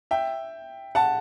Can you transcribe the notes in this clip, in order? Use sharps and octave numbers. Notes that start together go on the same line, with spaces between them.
E5 G5
F#5 A5